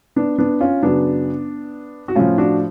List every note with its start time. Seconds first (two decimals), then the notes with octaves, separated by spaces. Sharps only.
0.16 B3 D4
0.38 B3 D4
0.60 C#4 F4
0.83 F#2 C#3 F#3 B3 D4
2.08 F#4
2.15 A2 F3 C#4 F4
2.38 D4 F#4